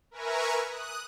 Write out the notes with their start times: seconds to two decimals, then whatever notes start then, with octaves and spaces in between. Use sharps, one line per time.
0.11 A#4 B4 E5 G#5 A#5 C#6
0.65 D#6 F#6